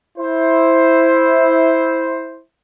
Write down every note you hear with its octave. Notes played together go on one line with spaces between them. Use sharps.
E4 C5